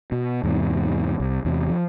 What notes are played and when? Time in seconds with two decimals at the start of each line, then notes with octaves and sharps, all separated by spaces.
0.12 B2
0.43 E2 G#2 C3
1.20 C2
1.45 E2 C3
1.69 F3